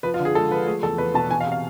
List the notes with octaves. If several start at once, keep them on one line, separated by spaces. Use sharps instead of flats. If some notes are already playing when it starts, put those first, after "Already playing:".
F3 B4
F4
D3
G#4
G#3 A4
F3 B4
A3 G#4
E2 A4
E2 B4
B2 A5
E3 G#5
F5
C3
F5